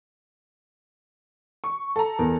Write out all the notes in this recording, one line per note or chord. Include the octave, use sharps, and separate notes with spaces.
C#6
A4 A#5
E2 A#4